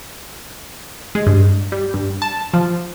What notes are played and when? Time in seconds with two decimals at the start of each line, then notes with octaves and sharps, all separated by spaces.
1.15 G#3
1.27 G2
1.72 G3
1.94 G2
2.22 A5
2.54 F3